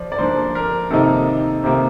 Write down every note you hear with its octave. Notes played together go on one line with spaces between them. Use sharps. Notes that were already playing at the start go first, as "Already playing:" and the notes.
Already playing: F3 D5
D5
F3 A#3 D4 C5
A#4
C3 D#3 A#3 D#4 A4
C3 D#3 A#3 D#4